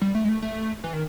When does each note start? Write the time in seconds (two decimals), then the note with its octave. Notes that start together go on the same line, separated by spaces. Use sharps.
0.01 G3
0.15 A3
0.24 G#3
0.29 A3
0.42 A3
0.84 E3
0.93 D#3